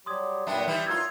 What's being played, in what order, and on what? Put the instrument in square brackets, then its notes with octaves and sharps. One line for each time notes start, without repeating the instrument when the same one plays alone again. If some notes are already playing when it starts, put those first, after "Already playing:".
[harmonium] F#3 G3 G4 [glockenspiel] C6 D#6 G#6
[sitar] F#2 B3 D4 [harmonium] A#2 G3 [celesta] E5 G5
[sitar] E3 G3 E4 [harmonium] B4
[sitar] F#2 F4 [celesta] A#5 E6 G#6